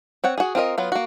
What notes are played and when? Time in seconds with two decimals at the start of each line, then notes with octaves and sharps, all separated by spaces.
0.24 C4 C#5 F#5
0.38 F#4 G#4
0.55 C4 F4 A#4 D#5
0.78 F#3 B3 F4
0.92 A#3 F#4